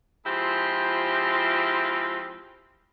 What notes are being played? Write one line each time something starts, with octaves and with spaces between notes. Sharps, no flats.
F3 G#3 C4 E4 F4 G4